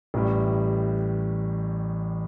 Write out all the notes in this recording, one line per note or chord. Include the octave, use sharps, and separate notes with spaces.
A1 A2 G3